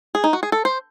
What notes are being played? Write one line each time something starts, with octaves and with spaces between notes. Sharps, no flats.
G#4
D#4
F#4
G#4
A4
C5